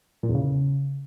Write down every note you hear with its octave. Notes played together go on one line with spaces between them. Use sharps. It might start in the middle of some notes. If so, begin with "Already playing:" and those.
A#2
E2
C#3